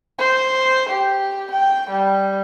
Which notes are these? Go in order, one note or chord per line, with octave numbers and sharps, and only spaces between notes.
C5
G4
G5
G3